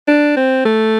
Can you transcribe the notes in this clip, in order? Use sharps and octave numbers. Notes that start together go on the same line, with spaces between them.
D4
C4
A3